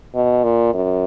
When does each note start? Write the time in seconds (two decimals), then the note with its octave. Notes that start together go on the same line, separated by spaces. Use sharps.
0.15 B2
0.44 A#2
0.74 F#2